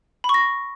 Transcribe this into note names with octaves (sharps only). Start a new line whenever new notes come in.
B5
C#6
A#6